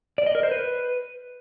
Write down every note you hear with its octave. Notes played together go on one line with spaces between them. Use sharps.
D5
D#5
A#4
C5
B4